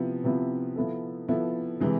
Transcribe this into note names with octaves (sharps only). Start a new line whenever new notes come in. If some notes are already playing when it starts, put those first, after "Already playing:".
Already playing: C3 F3 B3 E4
C3 F3 B3 E4
F3 B3 E4 A4
F3 B3 E4 A4
C3 E3 G#3